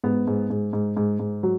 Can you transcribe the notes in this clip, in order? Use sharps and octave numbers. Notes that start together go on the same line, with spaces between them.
G#2 B3
G#2
G#2
G#2
G#2
G#2
F#3